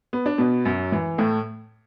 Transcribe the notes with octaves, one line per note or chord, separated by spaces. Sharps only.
B3
D4
B2 B3
F#2 F#3
E3
A2 A3